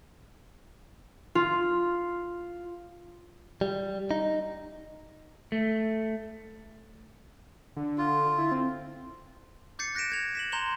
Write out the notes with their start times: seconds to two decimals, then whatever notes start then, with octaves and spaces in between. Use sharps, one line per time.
1.35 F4
3.61 G3
4.11 D#4
5.52 A3
7.76 D3
7.98 F4
8.38 E4
8.51 C4
9.79 D6 G6 A6 C7 C#7
9.95 F#6 A#6 B6 D7 E7
10.10 G6 G#6 F7
10.35 B6 E7 F#7
10.52 A#5 C6 G6 E7 F7 G7